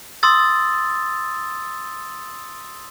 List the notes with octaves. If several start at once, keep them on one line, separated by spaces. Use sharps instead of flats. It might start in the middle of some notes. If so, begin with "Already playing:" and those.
C6 D#6 E6 A6